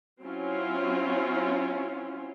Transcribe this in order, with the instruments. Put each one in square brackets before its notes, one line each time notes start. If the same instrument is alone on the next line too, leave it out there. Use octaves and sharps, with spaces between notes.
[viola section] F#3 C4 C#4 E4 F4